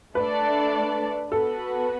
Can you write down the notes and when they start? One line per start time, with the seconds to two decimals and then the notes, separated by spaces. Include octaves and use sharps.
0.15 A3 D4 A4 B4 D5
1.31 B3 F#4 A4 B4